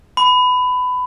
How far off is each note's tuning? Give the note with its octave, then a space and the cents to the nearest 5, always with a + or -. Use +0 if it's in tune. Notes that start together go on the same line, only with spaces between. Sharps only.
B5 +20